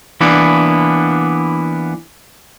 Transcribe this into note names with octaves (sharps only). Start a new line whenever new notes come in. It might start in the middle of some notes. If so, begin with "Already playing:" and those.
E3 A#3 B3 D4 E4